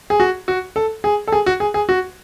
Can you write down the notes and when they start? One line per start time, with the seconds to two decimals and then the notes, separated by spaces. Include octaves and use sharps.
0.10 G#4
0.20 F#4
0.48 F#4
0.76 A4
1.04 G#4
1.27 A4
1.32 G#4
1.46 F#4
1.60 G#4
1.74 G#4
1.89 F#4